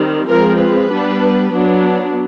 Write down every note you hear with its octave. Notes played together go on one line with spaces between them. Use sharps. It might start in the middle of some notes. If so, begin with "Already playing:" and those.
Already playing: D#3 G3 C4
F3 G#3 C4 A#4
B4
G3 B3 D4
F#3 B3 D4